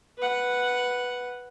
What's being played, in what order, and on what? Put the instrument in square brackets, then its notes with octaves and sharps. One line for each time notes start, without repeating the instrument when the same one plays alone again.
[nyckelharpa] B4 F#5